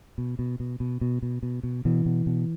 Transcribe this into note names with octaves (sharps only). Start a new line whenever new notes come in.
B2
B2
B2
B2
B2
B2
B2
B2
B2 E3
B2
B2